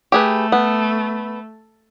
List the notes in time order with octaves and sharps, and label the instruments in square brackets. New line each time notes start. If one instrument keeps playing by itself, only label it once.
[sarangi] A3 [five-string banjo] G4 G#4 B4
[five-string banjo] B3